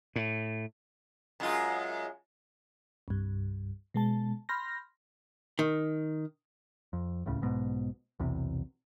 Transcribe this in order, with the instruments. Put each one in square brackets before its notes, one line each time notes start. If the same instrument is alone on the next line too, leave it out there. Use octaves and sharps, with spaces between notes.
[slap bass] A2
[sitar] F#2 G#3 F4
[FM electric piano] C2 G2
B2 G#3 A5
B5 C6 F6 G6 A#6
[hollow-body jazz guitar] D#3
[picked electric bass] F2
D#1 C#2 A2 C#3
B1 G#2 B2
B1 E2 C3